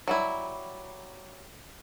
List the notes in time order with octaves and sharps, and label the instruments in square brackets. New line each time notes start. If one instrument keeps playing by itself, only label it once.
[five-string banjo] F#3 G3 E4